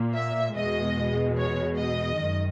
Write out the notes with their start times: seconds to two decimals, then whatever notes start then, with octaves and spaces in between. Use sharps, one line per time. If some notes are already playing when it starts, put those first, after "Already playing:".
Already playing: A#2 A#3
0.14 E5
0.55 E2 B2 G#3 D#5
1.38 C#5
1.77 D#5
2.19 F#2 D#3